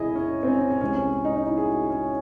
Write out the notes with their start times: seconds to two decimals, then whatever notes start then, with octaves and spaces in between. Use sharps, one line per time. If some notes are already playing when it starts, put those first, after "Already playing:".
Already playing: E1 C3 E4 G#4 D#5
0.15 C#4
0.43 C4
0.48 C#4
0.59 C#4
0.70 C#4
0.81 C2 C3 E3 G#3 C#4
0.96 C#4
1.25 D#4
1.36 D#4
1.46 E4
1.58 G#4
1.69 F#4
1.90 C#4